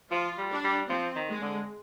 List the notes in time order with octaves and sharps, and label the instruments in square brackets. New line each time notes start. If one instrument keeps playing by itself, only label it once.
[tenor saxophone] F3 [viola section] F4
[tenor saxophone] G3
[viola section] D4
[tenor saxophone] G3
[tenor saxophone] F3 [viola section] C4
[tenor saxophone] D#3
[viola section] G#3
[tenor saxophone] D3